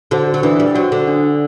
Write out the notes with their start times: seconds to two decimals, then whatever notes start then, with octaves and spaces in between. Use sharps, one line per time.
0.11 D3 F#4 C5
0.34 F#3
0.43 E3 D4
0.60 G3
0.75 F#3 F#4 C5
0.92 D3
1.08 D4